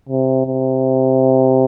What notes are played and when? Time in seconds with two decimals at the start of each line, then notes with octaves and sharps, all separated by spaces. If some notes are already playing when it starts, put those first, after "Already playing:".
0.09 C3
0.46 C3